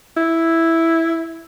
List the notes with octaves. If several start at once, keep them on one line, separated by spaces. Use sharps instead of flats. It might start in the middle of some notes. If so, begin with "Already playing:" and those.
E4